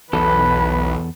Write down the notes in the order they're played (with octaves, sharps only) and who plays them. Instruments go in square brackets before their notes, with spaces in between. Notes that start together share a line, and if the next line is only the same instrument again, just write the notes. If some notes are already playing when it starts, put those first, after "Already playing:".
[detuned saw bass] B1 [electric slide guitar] E2 A4 [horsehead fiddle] B4 [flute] B5